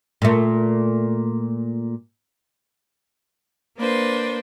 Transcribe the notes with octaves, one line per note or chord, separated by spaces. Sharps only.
A#2 A3
A#3 D4 B4 C5